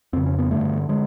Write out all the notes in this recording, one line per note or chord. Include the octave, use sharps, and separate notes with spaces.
F2 C#3 C4
C#4
B3
G2 D3 A3
D3 G#3